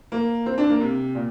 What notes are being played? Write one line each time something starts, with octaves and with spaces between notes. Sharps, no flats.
A#3
C4
D4
A#3
C3
A#2